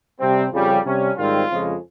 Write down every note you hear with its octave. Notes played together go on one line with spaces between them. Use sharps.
C3 G3 C4
F2 C#3 G3
C3 G3 C#4
G#2 D#3 G3 C4 F4
F2 C#3 F3 G#3